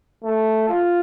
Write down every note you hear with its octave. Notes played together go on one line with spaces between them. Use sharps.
A3
F4